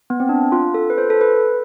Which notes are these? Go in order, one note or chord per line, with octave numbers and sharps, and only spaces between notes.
B3
C4
D4
F4
A4
B4
C5
A4
B4